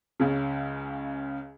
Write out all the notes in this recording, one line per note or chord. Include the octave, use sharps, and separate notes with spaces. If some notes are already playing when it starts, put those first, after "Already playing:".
C#2 C#3